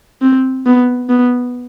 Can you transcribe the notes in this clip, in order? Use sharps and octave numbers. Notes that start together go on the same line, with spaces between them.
C4
B3
B3